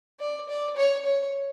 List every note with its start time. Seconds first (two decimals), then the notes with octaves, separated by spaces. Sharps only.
0.20 D5
0.49 D5
0.77 C#5
1.05 C#5